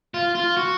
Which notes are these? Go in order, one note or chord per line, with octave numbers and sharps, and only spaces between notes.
F4
F4
F#4